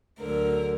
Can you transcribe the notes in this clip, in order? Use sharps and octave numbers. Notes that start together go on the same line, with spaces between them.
D2 D3 F#3 A#4